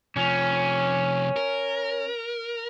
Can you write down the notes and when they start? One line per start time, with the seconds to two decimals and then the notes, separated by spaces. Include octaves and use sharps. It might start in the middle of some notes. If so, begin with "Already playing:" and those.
0.16 C3 F3 C#4
1.36 A#4